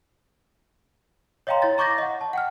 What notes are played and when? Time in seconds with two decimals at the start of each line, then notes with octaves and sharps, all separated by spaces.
1.47 C#5 D#5 F5 G5 A#5 C6
1.62 E4 C#5 A6
1.78 A#5 C#6 D6 G6 A6 A#6
1.98 D#5 F#5
2.21 A5
2.33 F#5 G5 F6